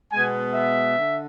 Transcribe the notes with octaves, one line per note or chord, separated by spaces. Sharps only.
B2 G#3 B3 G#5
E5
D3